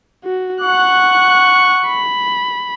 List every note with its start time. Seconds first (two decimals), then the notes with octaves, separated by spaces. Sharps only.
0.24 F#4
0.61 F#5 C#6 F#6
1.86 B5